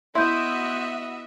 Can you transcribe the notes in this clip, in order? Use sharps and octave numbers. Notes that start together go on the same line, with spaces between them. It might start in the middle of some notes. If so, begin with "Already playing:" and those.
B3 E4 F#4 D#5 E5 C6 G6